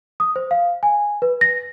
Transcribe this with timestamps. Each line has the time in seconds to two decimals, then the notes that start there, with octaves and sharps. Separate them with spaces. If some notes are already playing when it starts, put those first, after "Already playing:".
0.20 D#6
0.36 C5
0.51 F5
0.83 G#5
1.22 B4
1.41 A#6